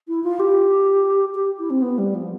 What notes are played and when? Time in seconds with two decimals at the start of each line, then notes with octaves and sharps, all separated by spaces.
0.08 E4
0.24 F4
0.40 G4
1.35 G4
1.59 E4
1.70 C4
1.82 B3
1.98 G3
2.14 F3